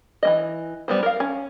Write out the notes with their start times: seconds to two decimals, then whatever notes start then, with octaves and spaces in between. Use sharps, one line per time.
0.23 E3 A#3 D#5
0.88 G3 B3 C5
1.03 A#4 F5
1.20 C#4